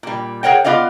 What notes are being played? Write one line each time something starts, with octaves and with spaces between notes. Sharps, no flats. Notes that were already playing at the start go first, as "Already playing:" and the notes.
A#2 G3
G#4 A#4 C#5 F#5 G5
B3 F4 D5 D#5 F5